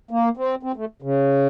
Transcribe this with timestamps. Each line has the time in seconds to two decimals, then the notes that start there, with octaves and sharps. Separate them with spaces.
0.11 A#3
0.37 C4
0.63 C4
0.76 A3
1.02 C#3